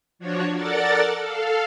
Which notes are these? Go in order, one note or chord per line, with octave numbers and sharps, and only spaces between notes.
F3 D4 F#4 C#5
A4 A#4 D5 F#5 A6
A4 F5